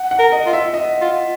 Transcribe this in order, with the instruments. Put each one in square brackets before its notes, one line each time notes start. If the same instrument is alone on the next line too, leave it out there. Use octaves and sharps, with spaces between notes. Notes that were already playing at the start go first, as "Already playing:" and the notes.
Already playing: [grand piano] F#5
F#5
[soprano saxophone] A#4
[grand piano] D#5
[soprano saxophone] F4
[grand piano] E5
D#5
[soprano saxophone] F4